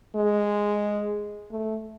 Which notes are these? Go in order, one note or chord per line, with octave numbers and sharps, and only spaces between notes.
G#3
A3